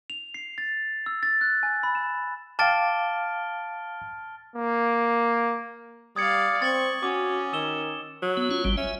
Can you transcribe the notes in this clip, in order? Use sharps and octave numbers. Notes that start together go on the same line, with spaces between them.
F7
C7
A6
E6
A6
F#6
G#5
B5
E7
F5 G5 A5 D6 F6 A6 D7
A#3
G3 D5 F5 D#6 G#6 C#7
C4 C#6 A6 F#7
C#4 F#4 D6
D#3 E6 E7 G7
F#3
B3
C#4 F4
G#1 G3
C#4 E5